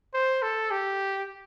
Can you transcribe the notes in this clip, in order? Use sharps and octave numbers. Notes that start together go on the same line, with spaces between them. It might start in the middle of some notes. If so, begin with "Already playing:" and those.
C5
A4
G4